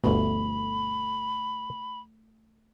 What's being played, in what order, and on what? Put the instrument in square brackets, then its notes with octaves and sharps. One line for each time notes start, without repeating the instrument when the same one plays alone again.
[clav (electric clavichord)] G1 D2 B2 [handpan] A3 [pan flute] B5